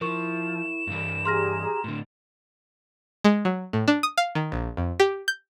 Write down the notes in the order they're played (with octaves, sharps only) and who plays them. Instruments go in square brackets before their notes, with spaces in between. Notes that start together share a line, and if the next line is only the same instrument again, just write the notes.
[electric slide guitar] F3 [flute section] E4 [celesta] A#4 C#6 [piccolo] E7
[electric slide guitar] G2 E3 G3
[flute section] G4 G#4 A#5 [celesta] C6 F6 A#6
[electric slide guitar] A2 D3
[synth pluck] G#3
F#3
A2
D4
D#6
F5
D#3
A#1
F2
G4
G6